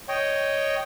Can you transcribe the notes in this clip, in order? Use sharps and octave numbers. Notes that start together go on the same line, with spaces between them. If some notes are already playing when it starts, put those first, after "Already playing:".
C#5 D#5 G5